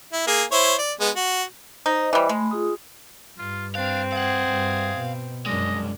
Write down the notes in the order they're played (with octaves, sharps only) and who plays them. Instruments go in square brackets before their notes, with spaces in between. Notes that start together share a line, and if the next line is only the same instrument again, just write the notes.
[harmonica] E4
A#3 G#4
E4 C5 C#5
D5
G#3 B3
F#4
[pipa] D#4 [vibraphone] C5 D#5
[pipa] E3 G3
[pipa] G#3 [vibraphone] A3 B5
[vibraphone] F4 G#4 D#6
[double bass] G2 [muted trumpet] F4
[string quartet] C4 [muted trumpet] D4 [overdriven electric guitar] F5
[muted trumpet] G#4 [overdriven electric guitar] F5 F#5
[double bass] G2
B2
[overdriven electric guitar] C2 G#3 [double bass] F#2 D4 [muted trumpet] D#5